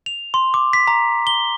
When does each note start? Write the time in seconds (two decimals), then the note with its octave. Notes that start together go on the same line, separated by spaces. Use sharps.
0.06 F7
0.34 C6
0.54 D6
0.73 B6
0.88 A#5
1.27 G7